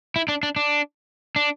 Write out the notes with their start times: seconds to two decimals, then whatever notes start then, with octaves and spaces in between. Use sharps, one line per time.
0.16 E4
0.28 D4
0.43 D4
0.56 D4
1.36 D4